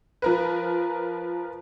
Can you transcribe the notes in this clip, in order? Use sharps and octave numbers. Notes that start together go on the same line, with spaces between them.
F3 A#4 B4